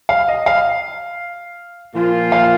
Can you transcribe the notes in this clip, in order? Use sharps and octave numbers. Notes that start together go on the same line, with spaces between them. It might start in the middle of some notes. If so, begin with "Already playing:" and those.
F5
D#5
F5
A#2 F3 A#3 F4
F5